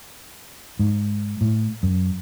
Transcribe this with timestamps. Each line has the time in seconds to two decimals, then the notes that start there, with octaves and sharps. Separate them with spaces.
0.79 G#2
1.41 A2
1.83 F#2